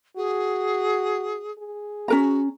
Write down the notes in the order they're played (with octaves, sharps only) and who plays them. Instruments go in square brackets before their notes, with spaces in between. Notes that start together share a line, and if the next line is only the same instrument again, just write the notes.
[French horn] F#4 [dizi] G#4
[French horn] G#4
[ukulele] C#4 A#4 A#5 [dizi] F#4